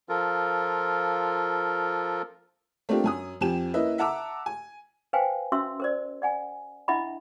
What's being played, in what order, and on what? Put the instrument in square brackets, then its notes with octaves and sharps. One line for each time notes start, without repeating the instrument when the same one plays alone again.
[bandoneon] F3 F4 A4 A#4
[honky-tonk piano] A3 A#3 C4 D4 F4 G4
F#2 G#5 D#6
F2 F3 G4 G#5 E7
A#3 C#4 E4 B4 D#5 E5
E5 F#5 A5 A#5 D6 E6
G#5
[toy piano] B4 C5 F5 G5 G#5
C#4 F#4 A#4 E5 C6 E6
A#4 C5 D5
D5 F#5 G#5
D4 E4 D#5 E5 F#5 B5